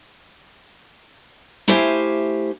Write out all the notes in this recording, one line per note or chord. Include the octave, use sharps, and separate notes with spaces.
A3 E4 G4 C5 F5 G#5